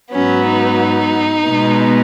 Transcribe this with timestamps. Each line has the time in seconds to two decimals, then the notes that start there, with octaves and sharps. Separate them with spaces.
0.12 G#2 F#3 B3 C#4
0.46 D#4
1.46 B2 G#3 B3